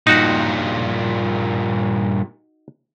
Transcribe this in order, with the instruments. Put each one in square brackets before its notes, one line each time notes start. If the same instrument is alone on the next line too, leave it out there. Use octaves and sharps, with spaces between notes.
[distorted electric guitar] G2 A#2 [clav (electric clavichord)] D#4 F#4